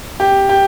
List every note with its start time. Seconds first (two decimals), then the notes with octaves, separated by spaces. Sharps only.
0.20 G4
0.49 G4